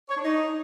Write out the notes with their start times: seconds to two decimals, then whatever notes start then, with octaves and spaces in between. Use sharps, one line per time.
0.09 C#5
0.16 D4
0.24 D#4